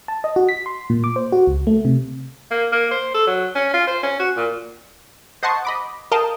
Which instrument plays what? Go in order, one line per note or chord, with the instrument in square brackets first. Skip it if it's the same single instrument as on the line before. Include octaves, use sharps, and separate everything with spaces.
[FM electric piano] A5
D#5
F#4
B6
C6
A#2
D6
C5
F#4
C#2
A3
C3
[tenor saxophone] A#3
A#3
C5
A4
F#3
C#4
F4
C5
C#4
F#4
A#2
[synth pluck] C5 D#5 F#5 A5 C6 C#6
D#5 B5 D6
A#4 D#5 F5 G5 A5